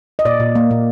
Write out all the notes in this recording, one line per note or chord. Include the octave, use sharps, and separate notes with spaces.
D#5
A#2 D5
A#2
A#3
A#2